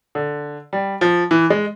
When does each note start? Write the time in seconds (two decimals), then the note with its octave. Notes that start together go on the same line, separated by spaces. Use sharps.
0.15 D3
0.73 G3
1.01 F3
1.31 E3
1.50 G#3